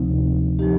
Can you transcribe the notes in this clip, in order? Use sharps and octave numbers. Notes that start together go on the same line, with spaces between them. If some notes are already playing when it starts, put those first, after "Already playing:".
Already playing: D2 C3 F3 C4 D#4
D3 F3 D#4 G4